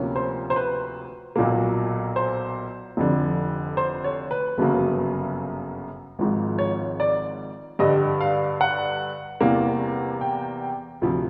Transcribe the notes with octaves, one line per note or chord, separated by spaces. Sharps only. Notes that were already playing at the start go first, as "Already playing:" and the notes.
Already playing: D2 C3 F3 A#3 C#4
C5
C5
B4
B1 A#2 F#3 A#3
C5
F1 F2 D3
C5
C#5
B4
G1 F#2 C#3 F#3 A#3
G#1 G#2 F3
C#5
D5
G2 D3 G3 D#5
F5
F#5
E2 C3 E3 G3 A#3
G5
D2 C3 F3